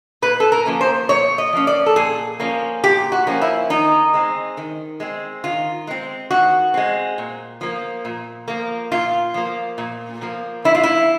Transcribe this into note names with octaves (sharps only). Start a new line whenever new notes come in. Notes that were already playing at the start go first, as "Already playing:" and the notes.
A#2 B4
A4
A#4
F3 A#3 C#4
C5
A#2 C#5
D#5
F3 A#3 C#4
D5
A4
A#2 G#4
F3 A#3 C#4
A#2 G4
F#4
F3 A#3 C#4
E4
D#3 D#4
G#3 C4
D#3
G#3 C4
D#3 F4
G#3 C4
D#3 F#4
G#3 C4
A#2
F3 A#3
A#2
F3 A#3
A#2 F4
F3 A#3
A#2
F3 A#3
F3 E4
F4
E4